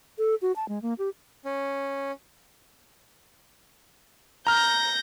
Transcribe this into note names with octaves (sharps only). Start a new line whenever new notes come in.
A4
F#4
A5
G#3
A#3
G4
C#4
A#5 F6 G6 A#6